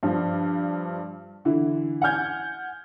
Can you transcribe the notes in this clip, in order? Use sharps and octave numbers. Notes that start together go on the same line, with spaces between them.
G2 F3 D4
D3 E3 E4
F#5 G#5 F6 G6 G#6